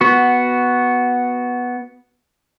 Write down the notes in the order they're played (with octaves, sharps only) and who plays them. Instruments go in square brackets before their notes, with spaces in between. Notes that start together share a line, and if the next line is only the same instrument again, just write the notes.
[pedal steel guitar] B3 F#4